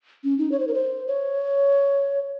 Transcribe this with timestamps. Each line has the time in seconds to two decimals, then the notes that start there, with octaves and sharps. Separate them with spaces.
0.24 C#4
0.38 D#4
0.52 C#5
0.60 C5
0.67 A#4
0.74 C5
1.08 C#5